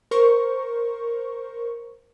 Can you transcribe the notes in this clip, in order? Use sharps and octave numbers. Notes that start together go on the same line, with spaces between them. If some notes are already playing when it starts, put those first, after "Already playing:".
A#4 C5 C#6